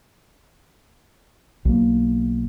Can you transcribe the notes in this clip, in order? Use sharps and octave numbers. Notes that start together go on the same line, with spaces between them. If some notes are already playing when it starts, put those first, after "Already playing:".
B1 A#3